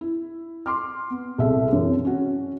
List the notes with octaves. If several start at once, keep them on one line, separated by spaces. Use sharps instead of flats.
E4
C6 D6 F6
B3
C2 B2 G#4 A4 E5
F#2 C3 E3
C#4 F#4